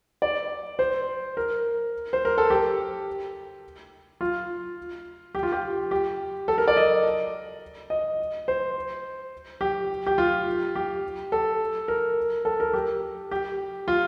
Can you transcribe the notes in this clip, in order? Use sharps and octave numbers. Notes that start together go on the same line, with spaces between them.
D5
C5
A#4
C5
A#4
A4
G4
F4
G4
F4
G4
G4
A4
A#4
D5
D#5
D#5
C5
G4
G4
F4
G4
A4
A#4
A4
A#4
G4
G4
F4